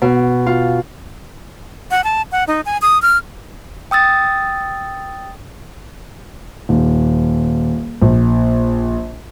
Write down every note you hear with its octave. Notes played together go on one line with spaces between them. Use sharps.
B2
F4
F#5
A5
F#5
D#4
G#5
D#6
F6
G5 D#6 E6 A6
D#1
A#1